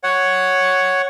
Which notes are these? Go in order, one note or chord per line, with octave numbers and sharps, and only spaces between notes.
C#5 F#5